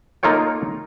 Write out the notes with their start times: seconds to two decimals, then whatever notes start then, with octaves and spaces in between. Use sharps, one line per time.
0.23 A#3 D#4 F4 A4 C#5 G5